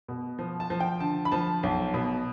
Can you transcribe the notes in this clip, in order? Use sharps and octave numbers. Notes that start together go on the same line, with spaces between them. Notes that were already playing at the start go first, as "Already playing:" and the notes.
B2
F3
A5
F3
G5
D3 A5
B5
F3 A5
B1
B2